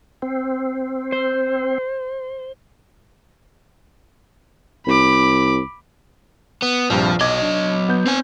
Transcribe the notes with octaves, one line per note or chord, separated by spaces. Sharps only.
C4
C5
C2 B5 D6
B3
A#1 G2 C3 F3
B1 F#3 D#5 D6 G#6
D4
B3 G6
C4 G#5